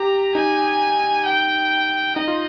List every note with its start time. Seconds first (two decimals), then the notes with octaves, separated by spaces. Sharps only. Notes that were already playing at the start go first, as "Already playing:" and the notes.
Already playing: G4 A#5
0.35 D#4 G#5
1.26 G5
2.16 D#4 D#5
2.28 F4